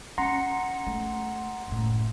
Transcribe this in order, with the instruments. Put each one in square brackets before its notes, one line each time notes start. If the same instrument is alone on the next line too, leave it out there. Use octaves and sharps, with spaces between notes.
[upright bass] C#4 [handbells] F#5 C#7 [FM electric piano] A#5 C6
[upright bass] A3
F#1 A2